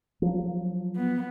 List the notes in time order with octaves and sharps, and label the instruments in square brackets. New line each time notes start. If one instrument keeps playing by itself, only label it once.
[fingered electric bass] F3 F#3
[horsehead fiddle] B3